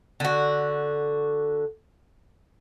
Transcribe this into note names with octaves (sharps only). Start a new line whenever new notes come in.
D3 F#4